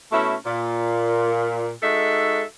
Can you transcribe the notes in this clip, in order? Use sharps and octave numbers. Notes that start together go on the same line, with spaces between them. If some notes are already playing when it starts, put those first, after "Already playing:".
B2 A3 C#4 E4
A#2
G#3 D#4 F#4 A4 E5